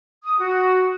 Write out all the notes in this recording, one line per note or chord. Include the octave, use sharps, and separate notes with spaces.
D#6
F#4